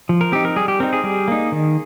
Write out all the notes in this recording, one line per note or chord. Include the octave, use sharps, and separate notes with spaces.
F3
A#4
C4 D#4 G4
A#4
G3 G#4
G4
C4 D#4 A#4
G#4
G3
A#3 D#4
D#3